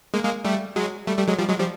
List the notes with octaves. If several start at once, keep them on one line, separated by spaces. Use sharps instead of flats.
G#3 A#3
G#3 A#3
G3 A3
F#3 G#3
G3 A3
G3 A3
F#3 G#3
F3 G3
F#3 G#3
F3 G3